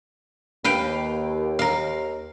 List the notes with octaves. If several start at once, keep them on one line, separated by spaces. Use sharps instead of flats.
D#2 B4 F5 G5
A#4 F5